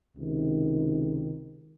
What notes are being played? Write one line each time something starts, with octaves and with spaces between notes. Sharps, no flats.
C#2 C3 D#3